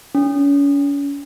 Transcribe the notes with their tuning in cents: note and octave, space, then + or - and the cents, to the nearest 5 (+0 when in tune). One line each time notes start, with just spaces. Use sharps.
C#4 +35